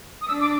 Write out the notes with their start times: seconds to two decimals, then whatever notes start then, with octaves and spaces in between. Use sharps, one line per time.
0.21 D#6
0.28 D4 E6
0.41 D6